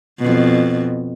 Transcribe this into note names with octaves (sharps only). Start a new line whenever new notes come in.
F2 B2